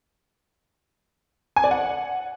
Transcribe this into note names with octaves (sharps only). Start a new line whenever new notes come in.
G#5
D5
F#5